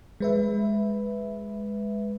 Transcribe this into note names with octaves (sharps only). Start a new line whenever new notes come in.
G#3 B4 E5